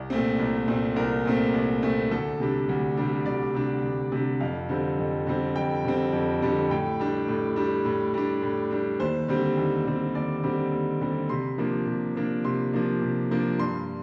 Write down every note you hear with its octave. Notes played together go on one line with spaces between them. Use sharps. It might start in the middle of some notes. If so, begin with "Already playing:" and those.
Already playing: C2
A#2 A3 C4
C2
A#2 A3 C4
C2 A#4
A#2 A3 C4
C2
A#2 A3 C4
D2 A4
C3 G3 D4
D2
C3 G3 D4
D2 D5
C3 G3 D4
D2
C3 G3 D4
F2 F5
D3 G3 C4
F2
D3 G3 C4
F2 G5
D3 G3 C4
F2
D3 G3 C4
A2 G5
G3 D4
A2
G3 D4
A2
G3 D4
A2
G3 D4
D#2 C5
D3 G3 C4
D#2
D3 G3 C4
D#2 D5
D3 G3 C4
D#2
D3 G3 C4
C3 C6
F3 A#3 D4
C3
F3 A#3 D4
C3 C6
F3 A#3 D4
C3
F3 A#3 D4
G2 C6